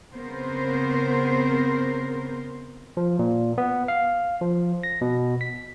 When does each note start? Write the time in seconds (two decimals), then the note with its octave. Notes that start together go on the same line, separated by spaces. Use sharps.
0.14 C#3 B3 C4 A#4 C5
2.97 F3
3.19 A#2
3.58 B3
3.88 F5
4.41 F3
4.83 A#6
5.01 B2
5.41 B6